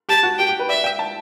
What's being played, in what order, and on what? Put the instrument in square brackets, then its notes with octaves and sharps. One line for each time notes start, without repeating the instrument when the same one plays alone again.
[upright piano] G4 [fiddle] A5
[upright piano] F#4
[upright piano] G4 [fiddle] G5
[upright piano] G4
B4
[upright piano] D5 [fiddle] E5
[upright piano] G5
A5